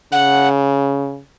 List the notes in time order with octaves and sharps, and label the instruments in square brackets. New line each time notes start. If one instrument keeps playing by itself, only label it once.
[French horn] C#3 [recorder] F#5